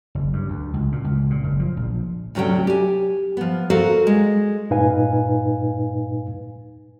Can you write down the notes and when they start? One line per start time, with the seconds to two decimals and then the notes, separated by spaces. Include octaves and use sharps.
0.15 F#1
0.33 G2
0.48 D2
0.74 C#2
0.92 A#2
1.04 C#2
1.30 A#2
1.44 F#1
1.60 F3
1.77 A#1
2.35 D2 C3 F#3 C#4 G5
2.67 G4 G#5
3.37 F3 B3
3.70 F#4 A4 A#4 C5 F5
4.07 G#3
4.70 G2 A#2 D#4 B4 F5 G#5